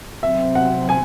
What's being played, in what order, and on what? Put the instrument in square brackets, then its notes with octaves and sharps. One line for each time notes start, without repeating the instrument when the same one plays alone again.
[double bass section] C3 F#3 C4 [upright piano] E5
[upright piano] F#5
G#5